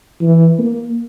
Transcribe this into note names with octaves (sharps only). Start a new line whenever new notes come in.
E3
A#3